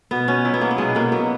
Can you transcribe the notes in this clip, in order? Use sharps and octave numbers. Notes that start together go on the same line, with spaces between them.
B2 B3
B2 C#4
F#3 E4
B3
F#3 A#3
B3
B2 G#3
B2 A#3
F#3 B3